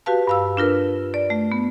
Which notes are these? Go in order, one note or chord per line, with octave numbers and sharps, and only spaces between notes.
F#4 G4 B4 F5 A5
G2 F5 E6
D4 F4 A#4 B4
D5
A3
B3